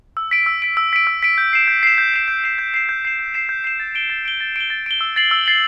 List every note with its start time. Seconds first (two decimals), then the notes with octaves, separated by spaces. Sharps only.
0.17 E6
0.31 B6 D7
0.46 E6
0.62 B6 D7
0.77 E6
0.93 B6 D7
1.07 E6
1.23 B6 D7
1.38 G6
1.53 C7 E7
1.68 G6
1.83 C7 E7
1.98 G6
2.14 C7 E7
2.28 G6
2.44 C7 E7
2.58 G6
2.74 C7 E7
2.89 G6
3.05 C7 E7
3.19 G6
3.34 C7 E7
3.49 G6
3.64 C7 E7
3.80 A6
3.95 D7 G7
4.10 A6
4.25 D7 G7
4.40 A6
4.56 D7 G7
4.70 A6
4.86 D7 G7
5.01 E6
5.16 A6 C7 F#7
5.31 E6
5.46 A6 C7 F#7